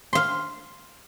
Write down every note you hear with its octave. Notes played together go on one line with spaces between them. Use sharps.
F5 C6